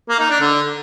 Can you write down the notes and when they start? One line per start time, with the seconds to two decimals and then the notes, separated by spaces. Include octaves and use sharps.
0.09 A#3
0.20 D#4
0.30 D4
0.41 D3